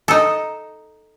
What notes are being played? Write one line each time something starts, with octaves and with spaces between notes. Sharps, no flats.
D#4 A4